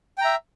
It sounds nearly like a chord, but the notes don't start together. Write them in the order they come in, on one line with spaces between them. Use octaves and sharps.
G5 A#5 E5